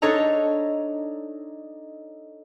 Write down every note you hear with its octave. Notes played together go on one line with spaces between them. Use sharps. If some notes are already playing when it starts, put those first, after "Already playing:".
D4 D#4 A4 C#5 D#5 A#5